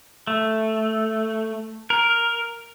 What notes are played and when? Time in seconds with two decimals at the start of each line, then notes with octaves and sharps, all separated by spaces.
0.27 A3
1.90 A#4